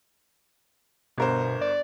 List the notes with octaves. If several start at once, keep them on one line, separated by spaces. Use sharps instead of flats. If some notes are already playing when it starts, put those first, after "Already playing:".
G1 B2 A#4 C5
D5